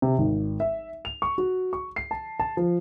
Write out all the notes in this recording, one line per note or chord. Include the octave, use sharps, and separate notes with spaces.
C3
G#1
E5
F7
C#6
F#4
C#6
C7
A5
A5
F3